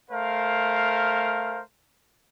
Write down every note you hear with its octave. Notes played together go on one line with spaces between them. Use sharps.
A3 A#4 C5 F5